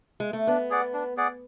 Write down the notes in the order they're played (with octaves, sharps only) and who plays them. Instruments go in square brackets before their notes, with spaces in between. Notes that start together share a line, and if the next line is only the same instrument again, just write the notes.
[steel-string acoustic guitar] G#3
A3
[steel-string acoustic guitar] B3 [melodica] D4
[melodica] G#4 D5 F#5
D4
G#4 D5 F#5